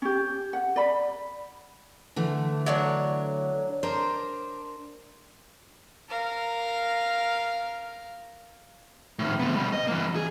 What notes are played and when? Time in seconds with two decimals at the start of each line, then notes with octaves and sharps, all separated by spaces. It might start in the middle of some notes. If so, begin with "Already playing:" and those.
0.02 C#4 G4
0.53 F#5
0.76 D5 B5
2.16 D3 E3 A3
2.66 F#3 D4 C#5
3.83 D4 A#4 C5
6.09 A#4 F5
9.19 A2 D#3
9.39 D2 B3
9.56 B2 G3
9.72 D#5
9.87 E3 A#3
10.15 G#4